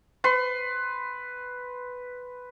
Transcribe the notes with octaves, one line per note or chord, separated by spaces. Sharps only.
B4 C6